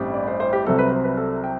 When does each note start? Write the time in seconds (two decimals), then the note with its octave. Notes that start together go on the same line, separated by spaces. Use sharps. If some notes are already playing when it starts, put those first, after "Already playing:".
Already playing: A1 G2 E3 G3 C4
0.14 D5
0.27 C5
0.40 C5
0.53 G4
0.65 C2 C3 F#3 C4 A4
0.79 B4
0.91 C5
1.04 B4
1.17 A4
1.44 G5